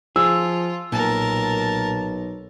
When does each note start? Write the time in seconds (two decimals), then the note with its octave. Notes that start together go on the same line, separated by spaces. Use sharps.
0.16 F3 F4 G#4 E6
0.92 B1 A#2 A#4 A5